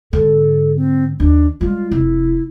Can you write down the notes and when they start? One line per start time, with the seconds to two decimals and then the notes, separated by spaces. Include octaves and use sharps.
0.13 G#2 D3 A4
0.76 C4
1.20 D#2 D4
1.61 G3 G#3 F4
1.92 F1 E4